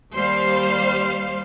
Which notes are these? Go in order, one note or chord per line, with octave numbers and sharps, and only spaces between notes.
D#2 G3 C5 F5